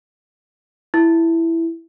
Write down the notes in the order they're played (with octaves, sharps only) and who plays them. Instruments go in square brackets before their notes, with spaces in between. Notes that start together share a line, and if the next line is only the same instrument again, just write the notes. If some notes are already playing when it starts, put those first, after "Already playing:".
[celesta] E4